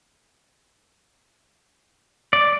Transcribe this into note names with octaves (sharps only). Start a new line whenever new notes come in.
D5